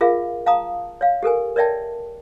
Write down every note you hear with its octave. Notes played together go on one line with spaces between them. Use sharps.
F4 G#4 A#4 E5 F5
F5 A5 A#5 D#6
C#5 F5
G4 A4 A#4 G#5
A#4 C#5 D5 E5 G5 A5